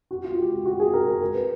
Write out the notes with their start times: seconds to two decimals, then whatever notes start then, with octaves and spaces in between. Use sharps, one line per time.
0.11 F#4
0.24 F4
0.38 G4
0.52 G4
0.66 F#4
0.80 G#4
0.94 A#4
1.08 A#4
1.21 A#4
1.35 B4